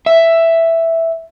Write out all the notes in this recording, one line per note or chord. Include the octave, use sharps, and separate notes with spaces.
E5